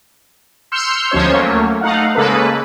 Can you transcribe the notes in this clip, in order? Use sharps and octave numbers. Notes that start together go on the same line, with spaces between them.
C6 E6 F6 G6 C#7
D2 F3 G#3 C#4 C5 C#5
F#3 A3 A#3 C#4
A3 D#4 F5 F#5
C#3 G#3 A#3 A4 B4